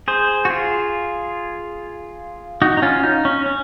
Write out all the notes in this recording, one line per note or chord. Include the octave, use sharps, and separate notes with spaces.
G#4 C5
F#4
F4 G#4
D#4 F#4
D#4
C#4 F4
D#4
C#4
C#4